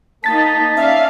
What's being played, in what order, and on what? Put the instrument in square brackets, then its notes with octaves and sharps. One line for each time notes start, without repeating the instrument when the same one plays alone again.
[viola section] A#3 D#4 [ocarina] A5 [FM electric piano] A6 B6
[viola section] C#4 D5 F5 [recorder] E5